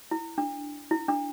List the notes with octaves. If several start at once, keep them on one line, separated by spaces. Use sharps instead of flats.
E4
D4
E4
D4